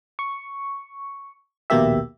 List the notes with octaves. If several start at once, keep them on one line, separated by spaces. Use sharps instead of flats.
C#6
A#1 D#2 B2 A#3 G4 E5